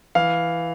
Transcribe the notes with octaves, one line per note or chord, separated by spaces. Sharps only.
E3 F5